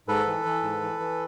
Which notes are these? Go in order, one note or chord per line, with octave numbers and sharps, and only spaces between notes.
G#2 A4 B4
E3
E3
G#2
E3
E3